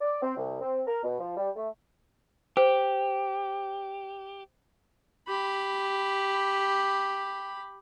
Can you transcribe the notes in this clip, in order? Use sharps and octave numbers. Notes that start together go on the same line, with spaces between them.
D5
C4
C2
C4
A#4
B2
F3
G3
A3
G4 C5
G4 B5